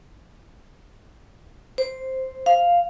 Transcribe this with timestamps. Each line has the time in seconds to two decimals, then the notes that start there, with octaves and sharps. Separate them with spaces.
1.78 C5
2.46 F5